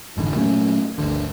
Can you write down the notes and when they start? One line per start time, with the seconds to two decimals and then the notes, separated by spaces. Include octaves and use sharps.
0.17 F1 G#2 D3 E3
0.34 A#2 F#3 A3 C#4
0.98 G1 D2 D3